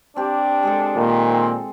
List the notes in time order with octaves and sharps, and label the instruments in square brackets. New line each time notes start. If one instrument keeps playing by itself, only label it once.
[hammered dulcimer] C4 G4 [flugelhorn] D4
[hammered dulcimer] G#3 G#4 A4
[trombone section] A#2 D#3
[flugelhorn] C4